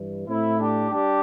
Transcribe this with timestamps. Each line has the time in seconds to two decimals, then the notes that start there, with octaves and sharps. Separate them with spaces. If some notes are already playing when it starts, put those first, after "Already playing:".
Already playing: G2 E3 G3
0.28 A2 A3 C4 E4
0.59 D4 G4
0.90 G3 D4 G4